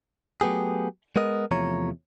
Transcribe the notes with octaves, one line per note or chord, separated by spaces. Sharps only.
F#3 A3 B3 G4 G#4
G#3 B3 A#4 D#5
E2 C3 F3 A3 C#5 A#5